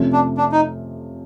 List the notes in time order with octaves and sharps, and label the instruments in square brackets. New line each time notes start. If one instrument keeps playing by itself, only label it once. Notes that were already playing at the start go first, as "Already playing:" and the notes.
Already playing: [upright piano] F2 C3 F3 A3 C#4
[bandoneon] D4
D4
D#4